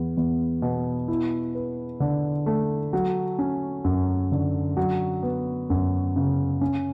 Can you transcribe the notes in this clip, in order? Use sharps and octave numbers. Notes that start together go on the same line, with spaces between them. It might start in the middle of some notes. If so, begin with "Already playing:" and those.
Already playing: E2
E2
B2
E4
B4
D3
A3
F#3
C#4
F#2
D3
F#3
B3
F#2
C#3
C#4